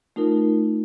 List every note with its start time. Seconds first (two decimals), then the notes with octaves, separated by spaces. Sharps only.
0.16 A3 D#4 F4 A#4